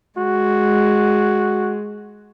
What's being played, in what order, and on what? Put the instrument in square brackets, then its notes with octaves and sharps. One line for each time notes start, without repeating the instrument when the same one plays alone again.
[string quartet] G#3 [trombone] F#4